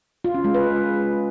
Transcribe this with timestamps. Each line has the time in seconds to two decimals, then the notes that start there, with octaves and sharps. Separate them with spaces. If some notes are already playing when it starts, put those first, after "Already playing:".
0.24 F4
0.34 C#4
0.44 G#3
0.54 B4